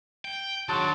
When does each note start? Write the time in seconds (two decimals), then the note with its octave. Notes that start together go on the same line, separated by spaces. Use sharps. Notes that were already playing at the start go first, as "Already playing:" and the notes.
0.25 G5
0.69 D#3 F#3 D4 G#4 D5 A5 C6